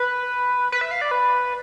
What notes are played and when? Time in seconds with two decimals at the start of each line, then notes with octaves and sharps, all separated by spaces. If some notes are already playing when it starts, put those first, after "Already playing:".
Already playing: B4
0.72 B4
0.81 E5
0.91 F5
1.01 D5
1.11 B4